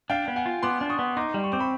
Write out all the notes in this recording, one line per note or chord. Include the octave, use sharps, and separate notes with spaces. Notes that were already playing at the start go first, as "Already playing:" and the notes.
D4 F5 G5
B3
F#5 G#5
F4
B3 C6 D6
D4
C#6 D#6
B3
D#4 C6 D6
G3
C#6
C4 D6
B5 C#6